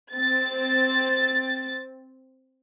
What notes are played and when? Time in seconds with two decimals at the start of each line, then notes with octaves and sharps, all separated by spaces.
0.12 C4 A6